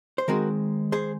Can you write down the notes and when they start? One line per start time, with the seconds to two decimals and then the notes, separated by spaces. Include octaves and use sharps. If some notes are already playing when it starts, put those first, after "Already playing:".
0.18 C5
0.28 D#3 G#3 C4 F#4 A#4
0.92 G#4 C5